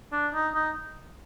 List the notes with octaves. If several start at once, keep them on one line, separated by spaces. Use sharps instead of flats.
D4
D#4
D#4